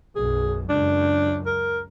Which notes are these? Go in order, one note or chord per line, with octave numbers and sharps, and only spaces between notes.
B1 F#2 G#4
C#2 F#2 D4
A#4